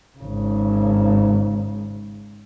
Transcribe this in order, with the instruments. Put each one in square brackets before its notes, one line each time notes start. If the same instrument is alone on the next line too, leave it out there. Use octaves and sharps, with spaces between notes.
[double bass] G#1 C#3